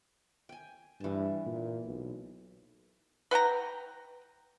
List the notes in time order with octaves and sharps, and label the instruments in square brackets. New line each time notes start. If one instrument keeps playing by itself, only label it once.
[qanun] G5 G#5
[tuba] G2 [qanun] E3 A5
[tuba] A#2
B1
[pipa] B4 F#5 G5 A#5